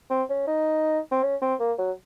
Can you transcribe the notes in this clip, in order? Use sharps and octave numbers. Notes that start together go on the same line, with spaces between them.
C4
C#4
D#4
C4
C#4
C4
A#3
F#3